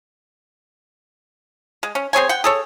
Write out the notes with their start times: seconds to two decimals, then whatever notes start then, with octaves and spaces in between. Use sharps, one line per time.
1.83 G#3
1.95 C#4
2.13 C4 G#4 C#5 G#5
2.29 F#5 G5
2.44 G#4 A4 C#5